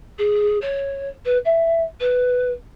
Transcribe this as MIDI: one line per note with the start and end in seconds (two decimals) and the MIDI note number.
0.18 0.57 68
0.61 1.08 73
1.25 1.38 71
1.45 1.82 76
2.00 2.51 71